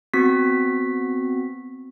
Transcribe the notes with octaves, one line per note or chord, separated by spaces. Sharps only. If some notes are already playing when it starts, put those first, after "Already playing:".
B3 C4 F#4 B6